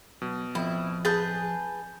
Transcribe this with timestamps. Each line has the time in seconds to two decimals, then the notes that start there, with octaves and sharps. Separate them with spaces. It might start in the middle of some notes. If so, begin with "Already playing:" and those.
0.22 B2 F#3
0.55 D1 F2 E4
1.05 G#4 B4 A5 G6 A6